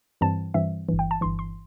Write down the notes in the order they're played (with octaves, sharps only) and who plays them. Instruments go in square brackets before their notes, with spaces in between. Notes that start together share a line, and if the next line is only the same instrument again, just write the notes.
[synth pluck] G2 E3 G3 C4 A5
G2 E3 G3 C4 E5
G1 G2 E3
G5
A5
G1 G2 E3 C6
C6